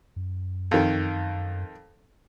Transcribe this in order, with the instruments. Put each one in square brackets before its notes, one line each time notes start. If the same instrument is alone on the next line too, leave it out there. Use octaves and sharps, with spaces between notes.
[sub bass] F#2
[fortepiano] F2 D#3